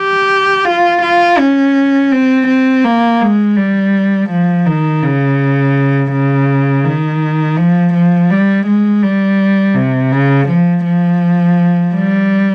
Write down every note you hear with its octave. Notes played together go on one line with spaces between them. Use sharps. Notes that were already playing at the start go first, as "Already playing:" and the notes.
Already playing: G4
F4
F4
C#4
C4
C4
A#3
G#3
G3
F3
D#3
C#3
C#3
D#3
F3
F3
G3
G#3
G3
C3
C#3
F3
F3
G3